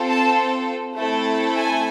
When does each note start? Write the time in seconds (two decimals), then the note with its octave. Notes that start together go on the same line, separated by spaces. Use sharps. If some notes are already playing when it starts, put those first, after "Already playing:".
Already playing: C4 F4 A4
0.09 A5
0.96 A3 C4 E4 A4
1.56 G#5